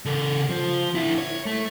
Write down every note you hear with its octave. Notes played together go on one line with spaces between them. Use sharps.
C#3 A4
F3
D3 E4
C#5
A3